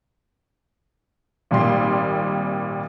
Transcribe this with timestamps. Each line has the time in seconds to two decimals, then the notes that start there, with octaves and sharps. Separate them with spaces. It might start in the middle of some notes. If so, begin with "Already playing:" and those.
1.51 G#1 A#2 G3 C6